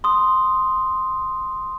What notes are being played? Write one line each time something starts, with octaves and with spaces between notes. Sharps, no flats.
C6 D#6